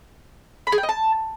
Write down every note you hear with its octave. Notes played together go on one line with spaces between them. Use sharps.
B5
G#4
G5
D#5
A5